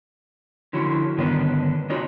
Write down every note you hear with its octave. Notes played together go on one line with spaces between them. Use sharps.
D3 F3 C#4 E4 F#4
G2 D3 D#3 B3 C#4 D4
C4 D#4 F4 F#4 C#5 D5